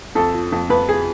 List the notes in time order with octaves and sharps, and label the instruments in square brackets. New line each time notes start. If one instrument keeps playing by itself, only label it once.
[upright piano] F2 A4
F3
F2
F2 B4
G#4